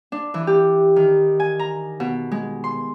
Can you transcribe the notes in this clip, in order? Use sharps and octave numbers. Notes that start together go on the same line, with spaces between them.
D4
E3
G4
D#3
G#5
A#5
B2
G#3
C6